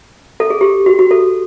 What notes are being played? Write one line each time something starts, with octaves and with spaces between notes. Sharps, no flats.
A4
G#4
G4
F#4
F#4
A4